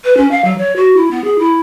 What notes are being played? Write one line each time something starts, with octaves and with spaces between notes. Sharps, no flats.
B4
C#4
F5
F#3
C#5
F#4
E4
B3
G#4
E4